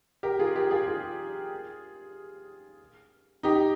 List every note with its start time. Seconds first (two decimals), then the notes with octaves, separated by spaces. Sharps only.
0.23 G4 A#4
0.39 F4 G#4
0.55 G4 A#4
0.71 F4 G#4
0.88 F4 G#4
3.43 D#4 G4